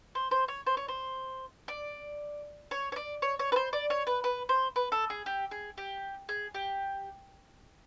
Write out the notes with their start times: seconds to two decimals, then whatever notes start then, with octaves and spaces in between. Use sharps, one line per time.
0.15 C5
0.31 C5
0.48 C#5
0.67 C5
0.77 C#5
0.88 C5
1.68 D5
2.71 C#5
2.92 C#5
2.96 D5
3.22 C#5
3.39 C#5
3.52 B4
3.56 C5
3.73 D5
3.90 C#5
4.07 B4
4.24 B4
4.49 C5
4.76 B4
4.92 A4
5.10 G#4
5.26 G4
5.51 G#4
5.78 G4
6.29 G#4
6.54 G4